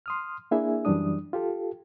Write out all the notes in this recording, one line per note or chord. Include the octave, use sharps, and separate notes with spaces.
C6 D#6 F6
A#3 D4 E4 G#4 E5 G#5
F#2 E3 G3 D4 D#6
F4 G4 A4